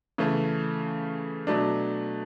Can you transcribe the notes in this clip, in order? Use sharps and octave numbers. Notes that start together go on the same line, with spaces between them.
C#3 E3 A3
B2 F#3 A3 D4